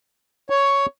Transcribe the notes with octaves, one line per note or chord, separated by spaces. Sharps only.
C#5